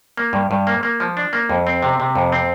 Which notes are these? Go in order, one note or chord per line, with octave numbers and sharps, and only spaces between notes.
A#3
G2
G2
A#3
A#3
F3
D4
A#3
F2
C4
C3
C3
F2
C4